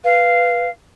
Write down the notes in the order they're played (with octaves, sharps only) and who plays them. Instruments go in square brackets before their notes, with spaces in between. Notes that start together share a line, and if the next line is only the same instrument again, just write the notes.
[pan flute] B4 [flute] F5